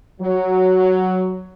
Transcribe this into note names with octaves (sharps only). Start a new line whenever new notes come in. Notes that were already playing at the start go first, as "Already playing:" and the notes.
F#3